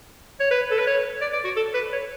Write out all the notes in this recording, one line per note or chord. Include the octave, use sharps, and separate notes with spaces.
C#5
B4
A4
B4
C#5
D5
D5
F#4
A4
B4
C#5